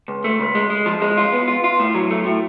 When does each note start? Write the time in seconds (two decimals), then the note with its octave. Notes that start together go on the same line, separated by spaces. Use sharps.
0.08 C#2
0.24 A3
0.40 C#2
0.55 G#3
0.70 G#3
0.86 F3
1.02 G#3
1.18 F4
1.33 B3
1.48 F4
1.64 F4
1.80 A2
1.95 F#3
2.11 A3
2.26 A2